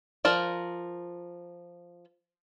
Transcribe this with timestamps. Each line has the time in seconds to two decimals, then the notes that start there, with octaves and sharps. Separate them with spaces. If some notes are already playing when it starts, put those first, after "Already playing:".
0.25 F3 A#4 D5